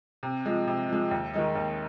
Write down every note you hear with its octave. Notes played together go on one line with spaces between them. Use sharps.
C3
F3 G#3
C3
F3 G#3
D#2
D#3 G#3 D#4
D#2